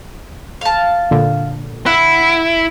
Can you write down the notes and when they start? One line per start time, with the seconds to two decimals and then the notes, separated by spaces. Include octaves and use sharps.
0.61 F5 A5
1.11 A#2 D3
1.86 E4 F#5